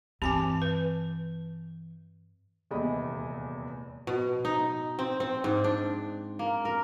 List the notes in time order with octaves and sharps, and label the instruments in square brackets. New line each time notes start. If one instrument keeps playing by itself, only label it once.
[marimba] G2 D6 [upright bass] E3 [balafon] C4 G#5 A5
[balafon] B4
[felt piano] D#1 E2 C3 G#3 D#5 B5
[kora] B2
D#4
C4
C4
G#2
D4
A#3
A#4